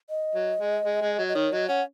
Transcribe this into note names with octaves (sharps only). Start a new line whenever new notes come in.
D#5
F#3
G#3
G#3
G#3
F#3
D#5
D#3 C#5
F#3 D#5
C#4 F#5